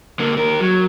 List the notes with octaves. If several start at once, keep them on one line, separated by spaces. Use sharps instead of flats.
D3 A#3
D#2 A#4
F#3